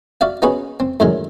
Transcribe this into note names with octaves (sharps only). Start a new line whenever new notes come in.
F#4 D5 E5 F5
B3 C#4 D#4 F#4 G#4 B4
C4
F#2 A2 D3 D#3 F#3 G#3